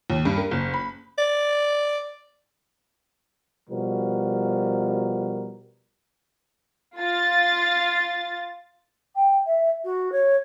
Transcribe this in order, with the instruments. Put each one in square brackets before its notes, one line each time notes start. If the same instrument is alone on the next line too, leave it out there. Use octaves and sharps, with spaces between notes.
[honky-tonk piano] D#2
G2
A#4
F#1
B5
[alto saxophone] D5
[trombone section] B2 F3 G3 F#4 A#4
[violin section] F4 A6
[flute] G5
E5
F#4
C#5